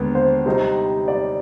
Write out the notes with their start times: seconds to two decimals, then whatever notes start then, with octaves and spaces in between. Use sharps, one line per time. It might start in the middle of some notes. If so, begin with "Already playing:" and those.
Already playing: D#2 D3 G#3 B3 B4
0.15 C5
0.46 C3 G3 C4 D#4 C5
1.08 D5